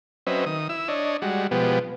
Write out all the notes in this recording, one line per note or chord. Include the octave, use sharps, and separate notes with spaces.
F#3 C4 C#4 B4 D#5 E5
D#3 D#6
E4 E6
D4 C#5 D#5
G3 G#3 F#4
B2 F3 G#3 B3 G4